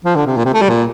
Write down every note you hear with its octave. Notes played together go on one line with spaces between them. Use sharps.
F3
D3
C3
A#2
C3
A3
G3
A#2